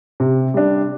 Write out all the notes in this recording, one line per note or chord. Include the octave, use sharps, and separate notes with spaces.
C3
G3 D4